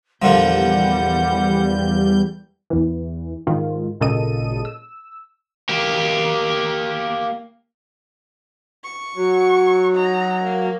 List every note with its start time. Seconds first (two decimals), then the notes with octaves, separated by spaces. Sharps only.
0.22 E2 A#2 D3 F3 G3 F#5 G6
2.70 E2 E3
3.47 G#2 D#3 F4
4.00 G#1 A#2 C#3 A4 D#5 D#7
4.65 E6
5.69 A#3 G4
8.85 C#6
9.16 F#3
9.94 D#4 A#5
10.43 A#3